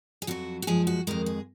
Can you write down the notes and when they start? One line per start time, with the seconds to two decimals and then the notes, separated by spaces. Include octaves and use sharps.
0.22 G#4
0.27 F2 D#3 F#3 F#4
0.62 F#4
0.67 F#2 F3 G#3 G#4
0.87 F#4
1.07 F2 D#3 G#3 A#4
1.26 G#4